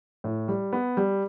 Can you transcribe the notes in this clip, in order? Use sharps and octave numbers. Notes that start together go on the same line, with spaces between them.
A2
G3
B3
G3